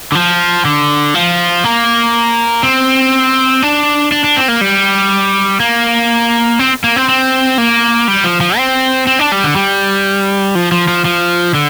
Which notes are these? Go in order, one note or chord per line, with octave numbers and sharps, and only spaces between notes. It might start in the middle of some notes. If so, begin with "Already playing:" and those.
D3
F3
D3
F3
A#3
C4
D4
D4
D4
C4
A#3
G3
A#3
C4
A#3
C4
C4
A#3
G3
F3
F3
C4
C4
D4
G3
D3
G3
F3
F3
F3
F3
D3